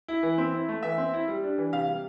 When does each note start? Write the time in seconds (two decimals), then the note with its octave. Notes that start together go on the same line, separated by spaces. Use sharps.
0.08 E4
0.23 E3
0.38 C4
0.54 E4
0.69 A3
0.83 E3 E5
0.98 C4
1.14 E4
1.28 G3
1.44 D4
1.58 E3
1.73 C3 F5
1.89 G3